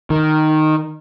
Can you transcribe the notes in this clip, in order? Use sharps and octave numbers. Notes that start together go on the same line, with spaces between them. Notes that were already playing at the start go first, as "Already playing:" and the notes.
D#3